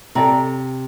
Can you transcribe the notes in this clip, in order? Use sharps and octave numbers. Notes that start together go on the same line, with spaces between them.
C3 A4 D5 G5 A#5